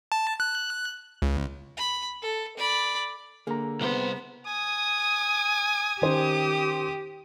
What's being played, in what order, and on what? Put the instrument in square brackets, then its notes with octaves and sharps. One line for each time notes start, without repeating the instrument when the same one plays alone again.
[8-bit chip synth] A5
F#6
C#2
[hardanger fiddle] B5
A4
D5 B5
[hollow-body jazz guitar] D3 A#3 [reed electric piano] G#4 A#5
[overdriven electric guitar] C2 C5 [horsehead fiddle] B3
[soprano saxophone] G#5 [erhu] D#6
[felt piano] D#3 C#4 C5 [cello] G4 [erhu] D#6